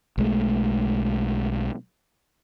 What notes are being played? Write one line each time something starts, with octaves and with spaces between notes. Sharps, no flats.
B1 G#3 A3